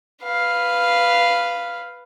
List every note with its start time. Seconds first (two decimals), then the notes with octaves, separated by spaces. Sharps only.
0.25 B4 F5